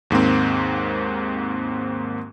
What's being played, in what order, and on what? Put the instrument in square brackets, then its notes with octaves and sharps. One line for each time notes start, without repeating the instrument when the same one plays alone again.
[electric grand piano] D#2 G#2 A#3 C4